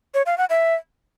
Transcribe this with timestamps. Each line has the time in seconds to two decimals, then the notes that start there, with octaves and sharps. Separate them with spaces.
0.14 C#5
0.26 F5
0.38 F#5
0.50 E5